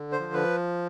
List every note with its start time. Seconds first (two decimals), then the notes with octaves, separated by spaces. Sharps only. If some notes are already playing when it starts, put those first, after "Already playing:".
Already playing: D3
0.12 C5
0.19 F3
0.34 B4